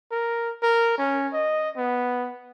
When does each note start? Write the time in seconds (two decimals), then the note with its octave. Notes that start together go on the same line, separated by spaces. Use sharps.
0.11 A#4
0.63 A#4
0.98 C#4
1.33 D#5
1.77 B3